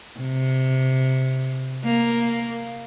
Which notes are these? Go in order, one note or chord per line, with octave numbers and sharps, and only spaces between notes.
C3
A#3